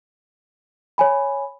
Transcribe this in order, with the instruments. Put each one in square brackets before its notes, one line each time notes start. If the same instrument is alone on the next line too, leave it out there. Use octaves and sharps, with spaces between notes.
[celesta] C#5 G#5 B5